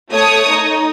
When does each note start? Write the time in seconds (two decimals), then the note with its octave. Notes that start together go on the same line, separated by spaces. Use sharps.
0.13 A3 C#5 D#6
0.51 D#4